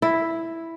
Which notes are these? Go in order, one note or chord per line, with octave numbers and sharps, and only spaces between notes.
E4